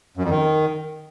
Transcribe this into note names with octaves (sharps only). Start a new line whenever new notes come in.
F#2
F2
D#3